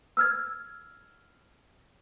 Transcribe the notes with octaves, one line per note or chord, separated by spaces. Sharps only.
E6 F6 G#6